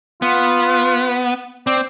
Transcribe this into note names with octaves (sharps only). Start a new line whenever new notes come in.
B3 F4
C4 D5